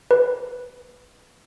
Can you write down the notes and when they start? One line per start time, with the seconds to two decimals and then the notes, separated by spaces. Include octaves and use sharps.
0.11 B4